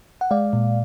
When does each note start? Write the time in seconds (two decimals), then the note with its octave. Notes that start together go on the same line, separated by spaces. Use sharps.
0.21 F#5
0.31 G#3 D5 F5
0.53 A#2